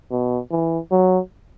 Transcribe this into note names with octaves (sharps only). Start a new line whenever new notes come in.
B2
E3
F#3